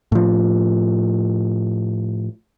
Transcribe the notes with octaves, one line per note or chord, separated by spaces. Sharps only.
A2 F3